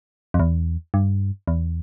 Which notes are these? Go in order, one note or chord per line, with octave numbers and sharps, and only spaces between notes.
F2
E2
G2
E2